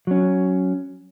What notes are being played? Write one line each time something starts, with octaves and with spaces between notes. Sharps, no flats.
F#3 C#4